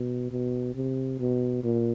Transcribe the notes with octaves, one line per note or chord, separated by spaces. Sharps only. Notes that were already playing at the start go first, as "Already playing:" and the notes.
Already playing: B2
B2
C3
B2
A#2